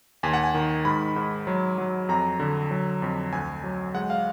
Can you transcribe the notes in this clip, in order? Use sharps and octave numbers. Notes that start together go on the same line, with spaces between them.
D#2 G#5
F#5
G#5
D#3
G#2 B5
G#2
F#3
F#3
F2 A#5
D3
F#3
F2
D2 G#5
F#3
G#3 F#5
F5